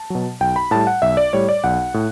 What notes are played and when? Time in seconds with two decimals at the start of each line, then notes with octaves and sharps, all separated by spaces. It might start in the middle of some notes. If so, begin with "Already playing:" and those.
Already playing: A5
0.10 B2 F#3
0.41 B1 G5
0.56 B5
0.71 A2 G3 A5
0.87 F#5
1.02 B1 E5
1.17 D5
1.33 A2 G3 C#5
1.49 D5
1.64 B1 F#5
1.94 A2